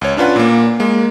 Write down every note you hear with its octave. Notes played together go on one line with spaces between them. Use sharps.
C#2 C#5
C#4 D4 F4 B4 F#5
A#2 A#3
G#3 A#3